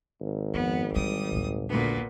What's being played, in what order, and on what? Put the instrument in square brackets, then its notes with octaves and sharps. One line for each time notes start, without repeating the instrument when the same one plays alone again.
[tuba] G#1
[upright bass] F2 [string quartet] B3
[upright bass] E2 D3 [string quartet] G3 D#6
[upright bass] A#1 D#2
[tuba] D2 [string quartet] A#2 B3